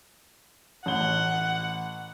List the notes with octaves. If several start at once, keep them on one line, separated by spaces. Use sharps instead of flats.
A1 F#5 G7